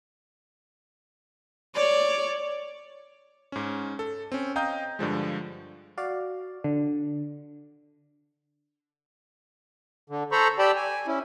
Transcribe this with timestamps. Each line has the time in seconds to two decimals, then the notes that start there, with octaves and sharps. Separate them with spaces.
1.75 C#5 D5
3.52 G#2 C#4
3.99 A4
4.32 C4 C#4
4.56 D#5 F5 G5 A#5 D#6 G6
4.99 G2 D3 F3 G#3
5.98 F#4 D5 F5
6.64 D3
10.10 D3
10.32 A4 C5 A#5 B5 C#6
10.59 G4 D5 G5 A5 B5 E6
10.76 G#5
11.07 C#4 E4